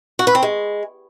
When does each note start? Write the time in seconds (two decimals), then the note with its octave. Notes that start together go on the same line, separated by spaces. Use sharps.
0.19 F#4
0.27 B4
0.35 C4
0.43 G#3